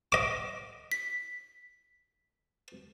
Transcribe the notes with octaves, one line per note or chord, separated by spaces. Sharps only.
D#5 D6
B6